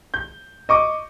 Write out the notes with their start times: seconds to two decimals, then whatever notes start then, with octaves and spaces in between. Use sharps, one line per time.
0.14 G6
0.69 D#5 C#6 D6